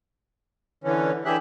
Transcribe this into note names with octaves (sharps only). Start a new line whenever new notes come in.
D3 E3 C#4
D3 E3 G4 G#4 E5 F#6